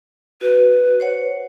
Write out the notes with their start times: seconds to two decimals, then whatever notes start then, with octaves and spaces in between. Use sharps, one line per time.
0.41 F#4 B4
1.00 C5 C#5 F#5